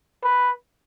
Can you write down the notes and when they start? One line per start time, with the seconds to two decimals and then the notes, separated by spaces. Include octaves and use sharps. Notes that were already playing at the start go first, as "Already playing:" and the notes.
0.24 B4